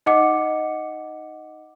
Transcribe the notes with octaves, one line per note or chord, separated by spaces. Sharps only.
D#4 D#5 F#5 D6 C#7